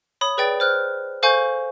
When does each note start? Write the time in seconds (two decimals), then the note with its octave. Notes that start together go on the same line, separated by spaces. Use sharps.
0.21 C#5 B5 D#6
0.37 G#4 B4 D5 G5 A6 D7
0.60 C5 F6 F#6
1.23 A4 C5 F5 G#5 C#6 G6